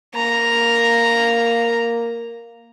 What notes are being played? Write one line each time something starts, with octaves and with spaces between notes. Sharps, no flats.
A#3 A#5